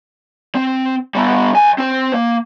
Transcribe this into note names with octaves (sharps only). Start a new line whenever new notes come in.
C4
G3 B3
B1 G#5
C4 C5
A#3